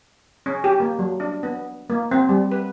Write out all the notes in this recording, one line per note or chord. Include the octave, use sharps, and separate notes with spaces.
C#4
G4
A#3
F#3
D4
B3
A#3
C4
G3
B4